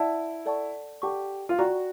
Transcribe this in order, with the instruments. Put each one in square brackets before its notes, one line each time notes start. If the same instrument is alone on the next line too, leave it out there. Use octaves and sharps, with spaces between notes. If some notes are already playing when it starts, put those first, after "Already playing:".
Already playing: [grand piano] E4 [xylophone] D5 F#5 A5
[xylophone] A4 D5 F#5 A5 C#6
[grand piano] G4 [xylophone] A4 D5 F#5 A5 C#6
[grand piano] F4
[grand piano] F#4 [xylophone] D5 G5 A#5 C#6